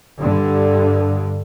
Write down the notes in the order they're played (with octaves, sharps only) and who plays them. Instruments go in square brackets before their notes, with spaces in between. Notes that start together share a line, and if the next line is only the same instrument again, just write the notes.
[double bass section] G2 D3